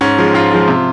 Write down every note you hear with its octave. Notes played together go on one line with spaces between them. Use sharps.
G#2 C#4
F3 G#3
G#2 F4
F3 G#3
C3